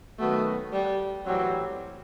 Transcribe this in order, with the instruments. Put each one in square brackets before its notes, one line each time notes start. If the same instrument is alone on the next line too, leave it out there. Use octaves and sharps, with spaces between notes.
[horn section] D#3 F#3 B3 F#4 [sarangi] A3
[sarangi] G3
[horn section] A2 E3 G3 C4 [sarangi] F#3